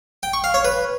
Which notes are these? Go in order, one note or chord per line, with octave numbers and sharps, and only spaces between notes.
G5
C#6
F5
C#5
B4